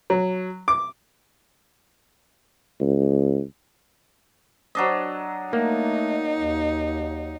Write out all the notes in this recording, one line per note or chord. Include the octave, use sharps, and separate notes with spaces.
F#3
D6
C#2
F#3 D4 D#5
A3 A#3 D#4
D#2